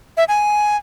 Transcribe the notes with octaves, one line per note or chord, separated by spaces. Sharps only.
E5
G#5